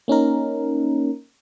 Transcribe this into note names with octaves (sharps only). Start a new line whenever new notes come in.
A#3 C#4 D#4 A#4